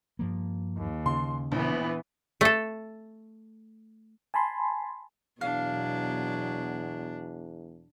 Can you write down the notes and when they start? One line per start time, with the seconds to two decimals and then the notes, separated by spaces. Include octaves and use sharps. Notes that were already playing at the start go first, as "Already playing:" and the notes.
0.19 G2 F3 A#3
0.78 D#2
1.06 C#3 C6
1.52 A#1 E3 B3
2.41 A3 A4
4.34 G#5 A5 B5 C6
5.41 E2 B2 F#3 D4 F5